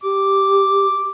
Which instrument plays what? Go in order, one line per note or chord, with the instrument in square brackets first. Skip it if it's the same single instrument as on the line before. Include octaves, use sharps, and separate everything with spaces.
[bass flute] G4 [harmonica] D6